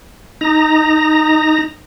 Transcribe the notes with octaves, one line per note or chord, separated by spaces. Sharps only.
D#4 A#5